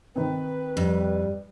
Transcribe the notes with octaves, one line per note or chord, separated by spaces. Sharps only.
D#3 C4 B4
F2 G3